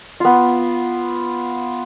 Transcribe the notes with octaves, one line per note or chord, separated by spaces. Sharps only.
B3 F4